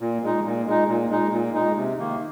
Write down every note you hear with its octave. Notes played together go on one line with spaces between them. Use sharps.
A#2
G#3 D#4
A#2
G#3 D#4
A#2
G#3 D#4
A#2
G#3 D#4
C3
D#3 A#3